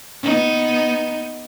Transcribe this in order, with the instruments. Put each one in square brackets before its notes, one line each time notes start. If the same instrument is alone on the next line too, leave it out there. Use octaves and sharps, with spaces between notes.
[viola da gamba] B3 D#4